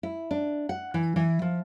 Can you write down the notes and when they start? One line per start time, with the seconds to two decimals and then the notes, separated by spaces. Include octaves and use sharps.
0.03 E4
0.31 D4
0.69 F#5
0.94 E3
1.16 E3
1.42 F3